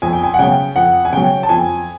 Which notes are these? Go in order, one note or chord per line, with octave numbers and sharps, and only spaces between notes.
F2 G#5
G5
G#5
F#5
C#3 F#3 G5
F2 F#5
G#5
C#3 F#3 G5
A5
F2 G#5